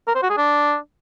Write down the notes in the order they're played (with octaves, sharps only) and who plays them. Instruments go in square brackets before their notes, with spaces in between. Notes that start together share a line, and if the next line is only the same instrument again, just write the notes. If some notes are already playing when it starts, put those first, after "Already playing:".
[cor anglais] A#4
C5
F#4
G#4
D4